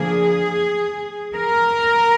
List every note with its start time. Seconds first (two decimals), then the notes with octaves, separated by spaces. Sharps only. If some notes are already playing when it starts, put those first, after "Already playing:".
Already playing: D3 F3 A#3 G#4
1.34 A#4